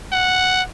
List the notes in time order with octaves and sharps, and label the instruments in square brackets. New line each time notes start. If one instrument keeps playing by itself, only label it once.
[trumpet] F#5